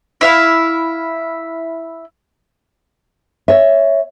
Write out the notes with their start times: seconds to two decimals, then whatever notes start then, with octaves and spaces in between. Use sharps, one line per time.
0.21 E4 E5 F5
3.48 C#5 E5